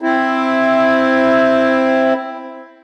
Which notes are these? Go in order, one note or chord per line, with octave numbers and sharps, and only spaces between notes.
C4 E4